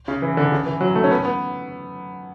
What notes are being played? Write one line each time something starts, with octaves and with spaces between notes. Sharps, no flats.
C#3
E3
D3
C#3
E3
F#3
A3
C#4
B3
B3